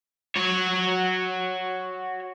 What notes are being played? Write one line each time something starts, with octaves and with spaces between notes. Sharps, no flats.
F#4 C#5